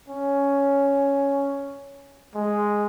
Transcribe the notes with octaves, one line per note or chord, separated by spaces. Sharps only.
C#4
G#3